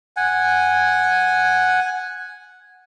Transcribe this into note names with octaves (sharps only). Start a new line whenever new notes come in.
F#5 G#5